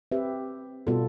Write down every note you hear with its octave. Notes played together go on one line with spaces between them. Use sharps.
C4 G4 B4 E5
B2 G3 B3 F4 A4